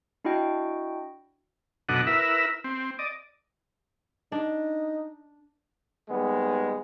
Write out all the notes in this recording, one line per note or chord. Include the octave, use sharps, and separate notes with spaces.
D4 E4 F#4 D#5 G5
F#2 B2 D4 A4 D#5 F#5
E4 A#4 B4 E5
C4
D5 D#5
D4 D#4
D#2 G3 G#3 B3